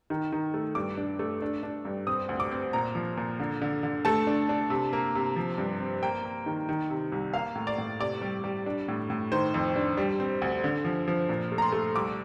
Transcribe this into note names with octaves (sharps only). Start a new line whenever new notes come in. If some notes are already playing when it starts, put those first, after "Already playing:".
D#3
D#3
A3
G2 D6
D4
A3
D4
D4
G2
C4 D#6
D2
D6
C4
A#2 A#5
F3
A#2
D3
D3
D3
A3 A5
D4
D4
C3
A#3
C3
F3
G2
C4
A#3 G5
A#3
D#3
D#3
C3
C2
A#3 F5
A2
D5
A2
C3 D5
G3
G3
D4
A2
A2
D#3 C5
F2
D4
G3
C4
D2
D3
F3
F3
A#2
A3
A#5
C6
A3
C2 D6